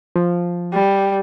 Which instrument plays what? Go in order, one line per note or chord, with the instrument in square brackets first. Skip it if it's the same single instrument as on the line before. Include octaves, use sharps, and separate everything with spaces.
[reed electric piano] F3
[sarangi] G3